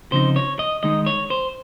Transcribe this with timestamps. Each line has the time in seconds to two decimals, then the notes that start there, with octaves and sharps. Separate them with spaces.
0.12 C#3 F3 C4 D#4 C5
0.36 C#5
0.59 D#5
0.83 D#3 G#3 D#4 D#5
1.06 C#5
1.30 C5